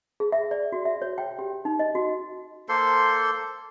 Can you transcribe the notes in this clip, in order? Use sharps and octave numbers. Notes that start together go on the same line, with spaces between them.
G#4
E5
D5
F#4
E5
C#5
G5
G4
D#4
D#5
F#4
A#3 A4 C5 C6